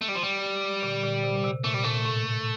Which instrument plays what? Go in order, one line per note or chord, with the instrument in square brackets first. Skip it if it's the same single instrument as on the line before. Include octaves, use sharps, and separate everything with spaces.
[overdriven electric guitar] A3
G3
F3
G3
[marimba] A#2 D3
A#2 D3
C3
A#2
C3
[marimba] A#2 [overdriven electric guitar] A3
[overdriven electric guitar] G3
[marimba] A#2 [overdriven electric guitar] A3
[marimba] A2